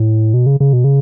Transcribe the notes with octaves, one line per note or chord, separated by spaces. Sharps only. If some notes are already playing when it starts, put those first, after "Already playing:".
Already playing: A2
B2
C#3
C#3
B2
C#3